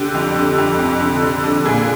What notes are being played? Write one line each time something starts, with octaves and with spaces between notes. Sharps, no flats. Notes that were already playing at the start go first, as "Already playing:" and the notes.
Already playing: D3 G4
F2
D3
F2
F2
D3
D3
D3
A#2 G#4